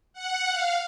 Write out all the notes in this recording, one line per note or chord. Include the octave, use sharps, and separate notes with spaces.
F#5
F5